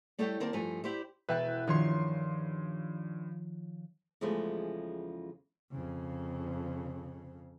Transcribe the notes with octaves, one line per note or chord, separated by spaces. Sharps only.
G3 A3 E4 A4 C#5 G5
D#2 C4 A#4 D5 A5
G2 F3 A3 G#5
E4 G4 C5 D5 E5
E1 B4 E5 G5 F#6 A6
G2 D#3 F3 C#5 C6
E2 C#3 F3 G#3 A3
F2 C#3